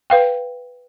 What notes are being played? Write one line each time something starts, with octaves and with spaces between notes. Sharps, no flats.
B4 F5 G5